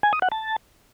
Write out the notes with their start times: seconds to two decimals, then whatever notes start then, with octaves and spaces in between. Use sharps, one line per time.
0.03 G#5
0.13 D#6
0.22 F#5
0.32 A5